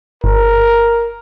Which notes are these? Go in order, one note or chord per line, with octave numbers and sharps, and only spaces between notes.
G1 A#4